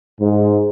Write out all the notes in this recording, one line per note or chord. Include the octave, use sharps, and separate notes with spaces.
G#2